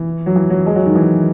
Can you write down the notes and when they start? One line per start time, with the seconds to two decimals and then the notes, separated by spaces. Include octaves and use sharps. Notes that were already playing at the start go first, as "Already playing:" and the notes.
Already playing: E3
0.26 F#3
0.36 E3
0.50 F#3
0.66 G#3
0.76 F#3
0.86 D#3
0.95 E3